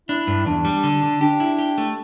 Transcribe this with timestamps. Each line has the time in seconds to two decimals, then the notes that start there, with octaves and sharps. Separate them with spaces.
0.08 D4 E4
0.27 G2
0.46 E2 D4
0.65 G3
0.83 D3
1.03 D3
1.21 D4 G4
1.40 E4
1.58 G4
1.78 A3